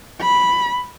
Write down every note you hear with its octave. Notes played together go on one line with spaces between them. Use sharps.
B5